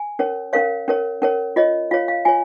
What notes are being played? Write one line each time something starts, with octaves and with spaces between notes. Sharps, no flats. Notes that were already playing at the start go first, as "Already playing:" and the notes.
Already playing: G#5
C#4 A#4 C#5
C#4 A#4 C#5 F5
C#4 A#4 C#5
C#4 A#4 C#5
F4 C#5 D#5
F4 C#5 F5
F5
F4 C#5 G#5